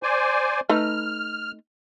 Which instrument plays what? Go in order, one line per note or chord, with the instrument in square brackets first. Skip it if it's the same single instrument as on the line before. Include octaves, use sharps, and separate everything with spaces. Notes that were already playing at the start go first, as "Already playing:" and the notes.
[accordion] C5 D5 G#5
[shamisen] A3 D#4 B4 [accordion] F6